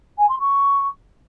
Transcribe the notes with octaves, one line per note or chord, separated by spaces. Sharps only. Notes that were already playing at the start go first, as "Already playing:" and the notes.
G#5
C6
C#6